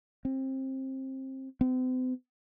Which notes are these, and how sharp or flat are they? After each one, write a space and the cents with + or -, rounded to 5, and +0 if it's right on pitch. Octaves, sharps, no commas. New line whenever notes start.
C4 +25
C4 -45